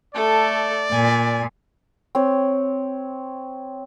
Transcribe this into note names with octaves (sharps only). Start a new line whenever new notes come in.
A3 A4 D5
A#2 G#5
C4 C#5